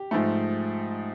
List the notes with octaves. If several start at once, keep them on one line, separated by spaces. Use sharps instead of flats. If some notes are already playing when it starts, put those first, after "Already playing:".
Already playing: G4
G#2 F3 A3